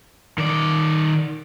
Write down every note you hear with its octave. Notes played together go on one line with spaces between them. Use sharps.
D#3 D5